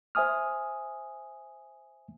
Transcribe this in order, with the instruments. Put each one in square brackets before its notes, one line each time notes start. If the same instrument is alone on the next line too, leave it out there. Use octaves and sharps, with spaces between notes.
[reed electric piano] C5 E5 G#5 D#6 F6